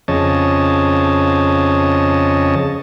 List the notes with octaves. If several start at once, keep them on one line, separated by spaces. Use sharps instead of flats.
F2 C#3 C#5 D#5 A5